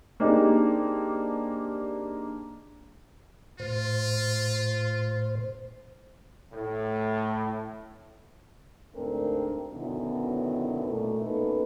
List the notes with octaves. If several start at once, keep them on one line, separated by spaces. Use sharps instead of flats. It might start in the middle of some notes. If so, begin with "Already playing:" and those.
A#3 C4 D4 D#4 G4 G#4
A2 F4 C5
A2
D2 G#2 A3 C4 D4 A#4
F#2 B2 D3 D#3 B3 E4
A#2 A3 A#3
B2 A#3 C#4 D#4 A4 B4